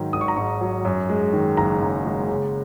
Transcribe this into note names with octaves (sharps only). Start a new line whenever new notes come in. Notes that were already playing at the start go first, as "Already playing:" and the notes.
Already playing: G#2 D#3 F#3
G#1 D#6
C#6
A#5
G#2 C#6
F#3
F#2
G#3
D#3
F#1 A#5
F#2
G#3
C#3